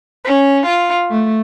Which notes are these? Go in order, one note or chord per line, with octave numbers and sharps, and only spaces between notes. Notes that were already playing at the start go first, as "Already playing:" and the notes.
C#4
F4
A3